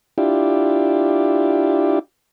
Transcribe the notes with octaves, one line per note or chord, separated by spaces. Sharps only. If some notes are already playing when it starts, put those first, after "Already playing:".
D4 E4 F4 G4